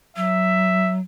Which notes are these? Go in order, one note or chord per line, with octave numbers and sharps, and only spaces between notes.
F#3 E5